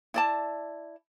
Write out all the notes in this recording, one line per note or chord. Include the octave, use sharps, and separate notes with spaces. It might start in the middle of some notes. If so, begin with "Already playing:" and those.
E4 D5 A5